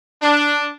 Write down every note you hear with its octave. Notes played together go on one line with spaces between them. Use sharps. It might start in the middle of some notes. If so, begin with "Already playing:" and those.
D4